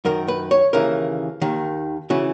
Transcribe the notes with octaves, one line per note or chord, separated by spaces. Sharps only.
F#2 D#3 A#4
B4
C#5
D#2 C#3 E3 A#4
D#2 D#3
C#3 E3 F#4